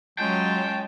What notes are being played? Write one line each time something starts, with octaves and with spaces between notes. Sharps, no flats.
F#3 G#3 C#4 F4 G5 A5